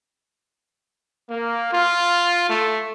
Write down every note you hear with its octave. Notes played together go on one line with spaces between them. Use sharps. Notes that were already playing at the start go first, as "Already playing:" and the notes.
A#3
F4
A3